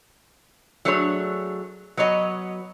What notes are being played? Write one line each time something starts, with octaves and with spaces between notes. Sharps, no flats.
F#3 A3 D4 G#4 B4 C#5
F#3 B3 C#5 D#5